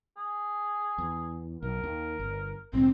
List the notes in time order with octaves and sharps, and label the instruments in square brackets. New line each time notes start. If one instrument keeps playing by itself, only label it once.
[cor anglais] G#4
[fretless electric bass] E2
[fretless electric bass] B1 [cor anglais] A#4
[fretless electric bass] D#2
G1
[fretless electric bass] A#1 G#2 D3 [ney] C4